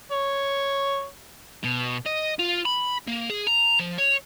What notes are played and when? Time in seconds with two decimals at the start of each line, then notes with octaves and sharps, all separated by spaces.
0.12 C#5
1.64 B2
2.06 D#5
2.39 F4
2.65 B5
3.07 A#3
3.30 G#4
3.47 A#5
3.79 F3
3.98 C#5